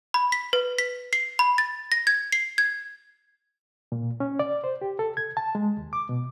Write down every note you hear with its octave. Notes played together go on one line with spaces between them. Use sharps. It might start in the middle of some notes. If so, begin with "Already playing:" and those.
B5
B6
B4
B6
C7
B5
A6
A#6
G#6
C7
G#6
A#2
C#4
D5
C5
G4
A4
G#6
A5
G#3
D#2
D6
B2